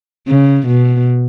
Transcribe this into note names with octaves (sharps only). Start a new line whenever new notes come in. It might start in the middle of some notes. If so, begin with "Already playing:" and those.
C#3
B2